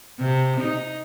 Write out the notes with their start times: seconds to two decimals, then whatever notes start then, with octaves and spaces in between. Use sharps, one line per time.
0.19 C3
0.61 D#4